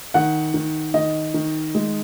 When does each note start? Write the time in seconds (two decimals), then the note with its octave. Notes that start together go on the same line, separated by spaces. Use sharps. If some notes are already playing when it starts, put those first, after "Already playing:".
0.14 D#3 F#5
0.54 D#3
0.94 D#3 D#5
1.34 D#3
1.75 G#3